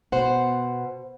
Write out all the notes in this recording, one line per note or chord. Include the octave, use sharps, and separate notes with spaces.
B2 C5 F#5